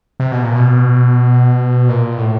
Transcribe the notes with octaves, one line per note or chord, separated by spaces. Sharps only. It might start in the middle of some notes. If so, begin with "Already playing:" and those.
C3
B2
A#2
B2
A#2
A2